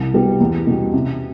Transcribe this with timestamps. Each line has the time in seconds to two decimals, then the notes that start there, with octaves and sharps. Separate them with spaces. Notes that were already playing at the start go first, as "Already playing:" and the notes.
Already playing: C2
0.14 B2 G3 B3 F#4
0.40 E2
0.67 B2 G3
0.93 C3